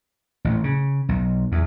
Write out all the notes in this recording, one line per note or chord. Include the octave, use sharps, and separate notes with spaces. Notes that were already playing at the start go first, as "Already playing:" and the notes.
A1
C#3
B1
E2